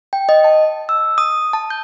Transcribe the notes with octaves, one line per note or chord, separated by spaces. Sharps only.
G5
D#5
A5
E6
D#6
A5
G6